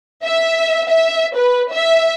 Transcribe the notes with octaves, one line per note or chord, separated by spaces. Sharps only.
E5
E5
B4
E5